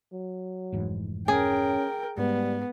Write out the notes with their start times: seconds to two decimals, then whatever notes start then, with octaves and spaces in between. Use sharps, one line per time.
0.13 F#3
0.72 F1 G#2 E3
1.28 C#4 G#4 A#4 G5
2.17 G#2 G3 B3